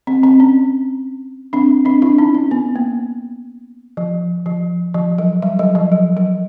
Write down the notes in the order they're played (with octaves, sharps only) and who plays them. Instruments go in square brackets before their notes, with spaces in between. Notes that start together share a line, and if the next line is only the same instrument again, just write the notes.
[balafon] C4
C4
C#4
C4 D4
C4 D4
D4 E4
C#4 D#4
C#4
B3
A#3
F3
F3
F3
F#3
G3
F#3
F3
F#3
F#3